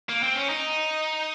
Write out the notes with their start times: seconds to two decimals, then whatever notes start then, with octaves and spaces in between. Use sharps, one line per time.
0.09 A#3
0.23 C4
0.36 C#4
0.50 D#4